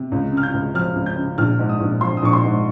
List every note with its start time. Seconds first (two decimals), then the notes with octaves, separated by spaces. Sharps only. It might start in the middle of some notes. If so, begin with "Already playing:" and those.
Already playing: C3
0.12 C#2
0.32 C#3 F6
0.43 G6
0.54 C#2
0.74 F3 F6
0.95 C#2
1.06 G6
1.17 C#3
1.38 A#1 F6
1.59 G#2
1.69 D#6
1.80 A#1
2.01 F3 C6
2.17 D#6
2.22 A#1 C#6
2.33 C6
2.44 G#2